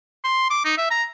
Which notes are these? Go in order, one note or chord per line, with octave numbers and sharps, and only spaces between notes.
C6
D6
D#4
E5
A#5